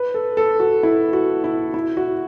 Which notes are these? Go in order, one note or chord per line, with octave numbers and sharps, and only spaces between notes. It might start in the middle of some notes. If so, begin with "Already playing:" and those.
Already playing: B4
A4
A4
F#4
E4
F#4
E4
E4
F#4